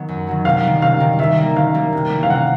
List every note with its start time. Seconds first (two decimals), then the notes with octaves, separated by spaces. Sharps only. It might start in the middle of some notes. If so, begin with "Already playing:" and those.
Already playing: D#3 F#3 B3
0.08 F#2
0.27 D#3 F#3 B3
0.45 C3 F5
0.64 D#3 G3
0.82 C3 F5
1.00 D#3 G3
1.19 D#3 E5
1.38 G3 A#3
1.56 D#3 F5
1.74 G3 A#3
1.93 C3
2.11 E3 G3 A#3
2.23 F5
2.30 C3 F#5